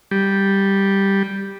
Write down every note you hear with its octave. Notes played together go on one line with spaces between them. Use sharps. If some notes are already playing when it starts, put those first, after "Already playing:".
G3